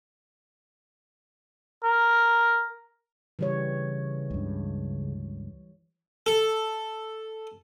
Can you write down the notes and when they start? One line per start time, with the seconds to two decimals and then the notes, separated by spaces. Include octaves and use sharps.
1.84 A#4
3.39 C#3 E3 G3 C#5
4.31 C#2 G2
6.26 A4